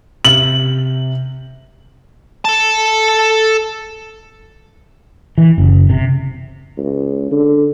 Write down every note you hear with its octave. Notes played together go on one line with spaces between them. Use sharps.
C3 F#7
A4 A5
E3
F#1
C3
C#2
D3